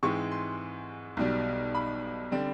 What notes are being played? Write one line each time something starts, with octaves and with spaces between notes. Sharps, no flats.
G#2 E3 G#3 C4 C#6
C6
B1 B2 G3
B5
D3 G3 C4